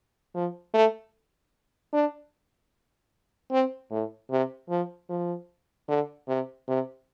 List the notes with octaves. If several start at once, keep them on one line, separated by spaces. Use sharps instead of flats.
F3
A3
D4
C4
A2
C3
F3
F3
D3
C3
C3